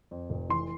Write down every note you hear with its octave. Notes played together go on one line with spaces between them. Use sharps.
F2
F1
E3 C6